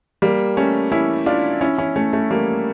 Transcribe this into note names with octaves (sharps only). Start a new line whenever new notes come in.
G3 A#3
A3 C#4
C#4 E4
D4 F4
C#4 E4
C#4 E4
A3 C#4
A3 C#4
G3 A#3